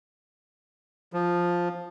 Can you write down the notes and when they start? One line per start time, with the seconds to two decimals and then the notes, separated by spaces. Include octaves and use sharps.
1.13 F3